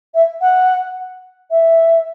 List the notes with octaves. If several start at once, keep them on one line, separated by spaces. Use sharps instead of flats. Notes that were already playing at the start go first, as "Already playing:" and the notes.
E5
F#5
E5